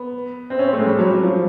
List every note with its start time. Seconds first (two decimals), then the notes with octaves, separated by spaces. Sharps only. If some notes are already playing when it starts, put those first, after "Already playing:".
Already playing: B3
0.50 C4
0.59 C#4
0.68 A3 C4
0.78 G#3
0.87 G3
0.98 F#3
1.11 F#3
1.23 F3